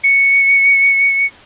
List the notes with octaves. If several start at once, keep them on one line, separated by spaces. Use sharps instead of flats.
C#7